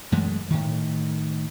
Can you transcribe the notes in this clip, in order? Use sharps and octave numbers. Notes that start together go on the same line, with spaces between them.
F#2 E3 G#3 A3
A2 D#3